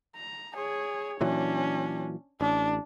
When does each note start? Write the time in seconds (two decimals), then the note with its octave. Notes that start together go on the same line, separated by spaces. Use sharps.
0.16 A#5
0.54 G#4 C#5
1.21 A#2 E3 F#3 C#4 D4
2.41 A1 D4